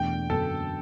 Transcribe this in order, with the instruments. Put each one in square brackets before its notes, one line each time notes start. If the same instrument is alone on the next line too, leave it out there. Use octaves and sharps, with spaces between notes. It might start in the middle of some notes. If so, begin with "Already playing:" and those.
Already playing: [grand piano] E2 B2 A3 D4 [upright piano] G5
[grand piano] F#2 D3 F#3 B3 [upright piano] A4